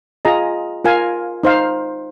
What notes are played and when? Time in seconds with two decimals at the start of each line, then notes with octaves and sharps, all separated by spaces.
0.25 F4 G#4 D#5 A#5
0.84 F4 A#4 F5 G#5
1.43 D#4 C5 F5